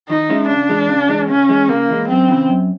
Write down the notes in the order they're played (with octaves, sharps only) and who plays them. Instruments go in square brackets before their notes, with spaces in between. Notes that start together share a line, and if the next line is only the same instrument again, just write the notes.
[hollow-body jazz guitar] D#3 [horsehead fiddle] D#4
[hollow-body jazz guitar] G#3 C#4 E4
[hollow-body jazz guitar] C#3 [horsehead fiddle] D4
[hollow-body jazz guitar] E3 G#3
C#3
E3 G#3
[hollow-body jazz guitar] C#3 [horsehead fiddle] C#4
[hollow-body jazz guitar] E3 G#3
[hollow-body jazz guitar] C#3 [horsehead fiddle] A#3
[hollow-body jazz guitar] E3 G#3
[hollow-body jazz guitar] F#2 [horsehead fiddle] C4
[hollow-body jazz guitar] C#3 E3
F#2